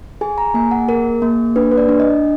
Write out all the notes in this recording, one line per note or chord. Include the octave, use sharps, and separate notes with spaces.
G#4 G#5
A#5
A#3 G#5
F#5
G#4 A#4
A#3
D4 B4
B4
D5
D4
D#5